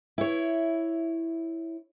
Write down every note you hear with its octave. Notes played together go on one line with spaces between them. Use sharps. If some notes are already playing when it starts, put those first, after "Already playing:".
E4 C#5